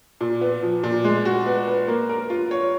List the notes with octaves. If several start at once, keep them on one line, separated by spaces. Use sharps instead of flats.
A#2
B3
F3
A#2
G#3
F#4
B3
B4
A#3
A#4
F4
C#5